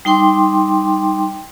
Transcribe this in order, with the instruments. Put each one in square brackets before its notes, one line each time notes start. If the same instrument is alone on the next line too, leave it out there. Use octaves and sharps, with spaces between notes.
[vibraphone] G3 D#4 G5 C6 D6